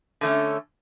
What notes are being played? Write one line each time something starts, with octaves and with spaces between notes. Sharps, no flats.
D3 A3 C#4